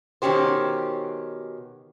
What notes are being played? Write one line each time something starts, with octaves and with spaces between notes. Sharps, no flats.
B2 D#3 C4 C#4 G4 C5